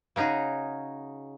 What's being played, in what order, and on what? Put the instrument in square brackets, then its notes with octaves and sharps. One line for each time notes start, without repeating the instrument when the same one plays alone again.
[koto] C#3 C#4 D#4 F#4 G#4